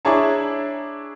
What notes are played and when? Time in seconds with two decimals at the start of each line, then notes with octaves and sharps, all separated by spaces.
0.05 D4 E4 G#4 C#5 A5 A#5